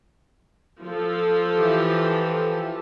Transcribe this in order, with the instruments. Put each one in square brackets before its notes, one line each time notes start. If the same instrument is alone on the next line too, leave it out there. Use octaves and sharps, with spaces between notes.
[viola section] F3 A4
[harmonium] E3 G4